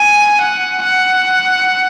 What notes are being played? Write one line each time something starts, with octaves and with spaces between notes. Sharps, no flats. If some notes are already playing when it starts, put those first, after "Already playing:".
Already playing: G#5
F#5
F#5